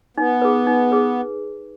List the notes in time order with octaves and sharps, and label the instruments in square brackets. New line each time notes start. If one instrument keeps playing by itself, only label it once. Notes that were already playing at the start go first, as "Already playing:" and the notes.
[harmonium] B3 [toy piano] D#4
[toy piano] G#4 B4
D#4
G#4 B4